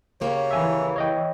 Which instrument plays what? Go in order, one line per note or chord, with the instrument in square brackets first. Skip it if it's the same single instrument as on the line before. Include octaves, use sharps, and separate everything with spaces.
[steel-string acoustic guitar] C#3 A#3 G4 [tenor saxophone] C#5
[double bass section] E3 [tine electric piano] E5 G#5 A#5
[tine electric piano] C#5 D#5 G5